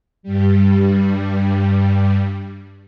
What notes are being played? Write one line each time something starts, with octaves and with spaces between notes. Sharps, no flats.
G2 G3